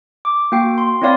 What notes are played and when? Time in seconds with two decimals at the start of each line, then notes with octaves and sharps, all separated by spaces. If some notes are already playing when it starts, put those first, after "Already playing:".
0.25 D6
0.52 A#3 F#4 G5 C7
0.78 C6
1.02 C4 E4 C#5 D5 F5 C6